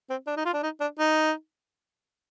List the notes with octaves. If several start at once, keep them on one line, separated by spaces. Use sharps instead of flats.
C4
D4
D#4
F4
D4
D#4
D4
D#4